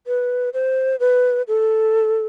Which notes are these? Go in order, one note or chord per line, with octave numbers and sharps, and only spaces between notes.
B4
C5
B4
A4